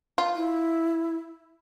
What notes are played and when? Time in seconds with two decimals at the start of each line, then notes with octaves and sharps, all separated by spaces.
0.18 F4
0.36 E4